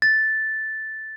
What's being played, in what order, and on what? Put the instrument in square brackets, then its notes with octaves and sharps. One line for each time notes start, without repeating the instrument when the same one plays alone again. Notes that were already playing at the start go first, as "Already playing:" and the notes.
[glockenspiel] A6